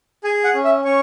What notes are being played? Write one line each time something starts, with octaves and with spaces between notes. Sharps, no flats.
G#4 G#5
F#5
C#4
E5
C#4 C#5